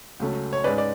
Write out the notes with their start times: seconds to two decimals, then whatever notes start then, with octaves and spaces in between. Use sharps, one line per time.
0.20 C#2 C#3 F#3 A3 C#4
0.53 C#5
0.64 G#2 G#3 C#4 B4 D5
0.78 D5